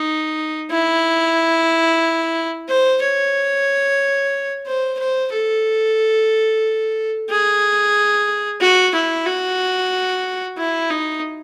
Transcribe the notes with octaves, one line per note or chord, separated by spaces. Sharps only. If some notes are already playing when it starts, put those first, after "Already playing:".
Already playing: D#4
E4
C5
C#5
C5
C5
A4
G#4
F#4
E4
F#4
E4
D#4